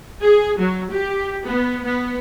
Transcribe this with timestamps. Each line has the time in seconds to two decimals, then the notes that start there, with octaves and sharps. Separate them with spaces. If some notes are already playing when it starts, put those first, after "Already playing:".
0.21 G#4
0.57 F#3
0.90 G4
1.45 B3
1.84 B3